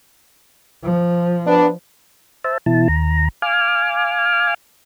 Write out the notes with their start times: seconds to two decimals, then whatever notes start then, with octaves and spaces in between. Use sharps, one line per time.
0.83 F3
1.46 B3 D4
2.44 C5 E5 A5
2.66 B2 E3 E4 A5
2.88 D#2 A#5
3.42 F5 G#5 D6 F6